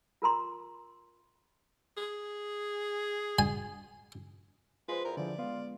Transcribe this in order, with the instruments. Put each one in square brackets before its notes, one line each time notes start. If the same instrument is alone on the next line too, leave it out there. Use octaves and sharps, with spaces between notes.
[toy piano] F4 A#4 A#5 C6
[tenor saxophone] G#4
[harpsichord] G#5
[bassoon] G#3 [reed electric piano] F4 C5 [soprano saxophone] B4
[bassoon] E2 [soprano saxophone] A#4
[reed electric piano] D3 F3 [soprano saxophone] D5
[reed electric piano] G#3 B3 [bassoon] F4